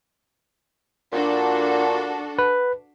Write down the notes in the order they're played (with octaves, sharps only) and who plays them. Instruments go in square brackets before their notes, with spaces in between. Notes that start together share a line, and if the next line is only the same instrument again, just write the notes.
[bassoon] A#2 [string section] D4 F#4 A4
[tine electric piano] B4